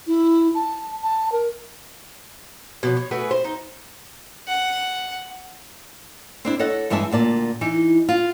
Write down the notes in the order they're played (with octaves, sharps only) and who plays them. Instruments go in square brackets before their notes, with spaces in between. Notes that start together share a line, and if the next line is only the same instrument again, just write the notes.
[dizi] E4
A5
A5
A#4
[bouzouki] B2 F3 C#5
C#5
A3 F#4 G#4 B4
C5
D#4
[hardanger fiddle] F#5
[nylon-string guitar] C4 D4 E4
A4 C#5 D#5 F#5
G2 E3 G#3 G#4 E5 A5
D2 A#2 D5 A5
E3 D#4
F4